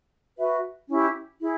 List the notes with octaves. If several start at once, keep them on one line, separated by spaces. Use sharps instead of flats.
F#4 B4 E5
C#4 E4 G4
E4 G#4